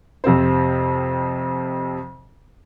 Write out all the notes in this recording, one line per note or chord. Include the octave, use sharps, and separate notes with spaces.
F2 C3 C4 C5